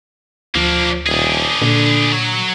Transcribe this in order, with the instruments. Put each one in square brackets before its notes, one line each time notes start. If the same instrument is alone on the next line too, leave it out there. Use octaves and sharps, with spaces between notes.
[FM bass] D2 [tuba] F3 [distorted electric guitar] A#3 D4
[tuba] D#1 [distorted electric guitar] D4 G#4
[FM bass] A#2 [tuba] D3
[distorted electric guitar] F#3 C#5